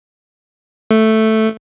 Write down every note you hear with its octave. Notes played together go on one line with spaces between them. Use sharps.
A3